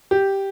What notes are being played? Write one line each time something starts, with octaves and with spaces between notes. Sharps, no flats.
G4